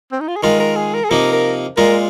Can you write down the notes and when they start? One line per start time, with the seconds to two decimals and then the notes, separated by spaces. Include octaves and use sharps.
0.12 C4
0.20 D#4
0.28 F4
0.36 G#4
0.43 D#3 G#3 F4 A#4
0.60 A#4
0.76 G#4
0.94 A#4
1.04 G#4
1.10 C3 F3 A#3 D#4 A#4
1.33 A#4
1.77 A#2 G#3 F4 A#4